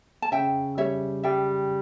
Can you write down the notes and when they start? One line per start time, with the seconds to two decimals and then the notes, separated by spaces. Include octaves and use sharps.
0.22 A5
0.32 C#3 E5 G5
0.77 G3 C#5 E5
1.23 G3 E5 G5